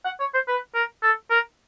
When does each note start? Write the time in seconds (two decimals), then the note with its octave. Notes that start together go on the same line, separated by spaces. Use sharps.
0.05 F#5
0.20 C#5
0.34 C5
0.48 B4
0.75 A#4
1.03 A4
1.31 A#4